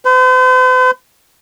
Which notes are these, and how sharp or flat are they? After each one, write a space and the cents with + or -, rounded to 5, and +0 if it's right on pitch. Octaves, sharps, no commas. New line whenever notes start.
C5 -45